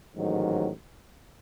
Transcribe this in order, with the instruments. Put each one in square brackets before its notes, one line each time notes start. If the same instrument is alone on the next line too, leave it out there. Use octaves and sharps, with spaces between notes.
[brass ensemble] A1 G#2 D#3 F#3